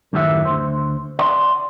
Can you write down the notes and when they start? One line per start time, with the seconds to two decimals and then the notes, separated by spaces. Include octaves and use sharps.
0.13 F#2 A2 D#3 G4 E5 F#5
0.45 D2 C5
1.19 D5 F#5 C6